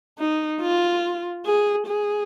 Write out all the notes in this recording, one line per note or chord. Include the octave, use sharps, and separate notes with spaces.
D#4
F4
G#4
G#4